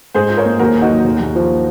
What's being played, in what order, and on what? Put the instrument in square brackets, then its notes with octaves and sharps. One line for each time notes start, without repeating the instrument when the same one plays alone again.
[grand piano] G#2 [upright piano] G#4 C5
[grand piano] F4
[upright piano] A#4 C#5
[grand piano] A#3
[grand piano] D#2 [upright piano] F#4 A#4
[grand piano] D#2
[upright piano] D#4 F#4
[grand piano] F#3
D#2
D#2
F3